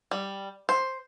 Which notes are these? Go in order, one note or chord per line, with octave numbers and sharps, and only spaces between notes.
G3
C5